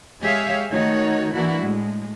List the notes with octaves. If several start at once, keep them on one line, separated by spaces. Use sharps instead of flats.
G#3 G4 G#4 C#5 E5 F5
D#3 A3 D#4 F#4 C#5
E3 A#3 D4 E4 F#4
A2 G#3